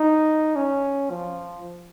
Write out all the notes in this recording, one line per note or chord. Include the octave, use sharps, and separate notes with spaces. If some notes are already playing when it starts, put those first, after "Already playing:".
Already playing: D#4
C#4
F3